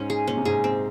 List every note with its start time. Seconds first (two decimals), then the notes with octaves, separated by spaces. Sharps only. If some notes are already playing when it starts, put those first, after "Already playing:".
Already playing: G#2 C#4 D#4
0.10 G#4
0.27 A#2 C#4
0.37 C3
0.45 G#2 G#4
0.64 C4